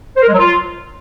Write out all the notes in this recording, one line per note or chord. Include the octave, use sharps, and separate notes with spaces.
C5
A#4
G#3
F#3
F4